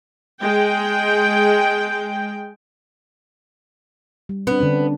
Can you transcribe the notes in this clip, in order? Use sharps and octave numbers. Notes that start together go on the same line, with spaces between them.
G#3 G5
G3
B3 C4 D4
D3 C#4 D4